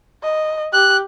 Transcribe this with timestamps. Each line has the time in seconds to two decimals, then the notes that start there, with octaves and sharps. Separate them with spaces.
0.23 D#5
0.73 G4 F#6